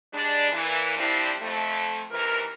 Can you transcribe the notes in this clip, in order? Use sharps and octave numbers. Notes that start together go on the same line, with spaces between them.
G3 G#3 D4
A#2 E3
F3 G3 C4 D4 E4
F2 A3
D#2 C3 E3 A#4